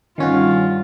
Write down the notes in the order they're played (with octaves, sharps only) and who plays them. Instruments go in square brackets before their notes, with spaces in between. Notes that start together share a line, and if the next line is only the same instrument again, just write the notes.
[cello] G2 F4 [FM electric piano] D#3 C#4 F#4